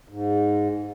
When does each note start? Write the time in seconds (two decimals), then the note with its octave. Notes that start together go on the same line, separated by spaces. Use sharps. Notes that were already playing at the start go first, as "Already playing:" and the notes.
0.09 G#2